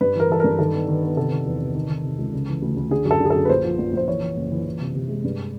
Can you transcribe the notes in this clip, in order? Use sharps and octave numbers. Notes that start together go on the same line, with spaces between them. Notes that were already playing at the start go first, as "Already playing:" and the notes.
G2 B4
E3 A#4
E3 A4
G2 A#4
D#3 A4
B3
D#3
B3
C3 A4
D#3
E2
C3
D#3
D#3
C3
C#2
C#3
E3
D2
D2
D3 G#4
F#2
A4
D3
G#4
F#2 A4
B4
A#1 C5
F3
A#1
A#1 C5
E3 C#5
E3
F#1
E3
E3
C3
C3
G#3
G2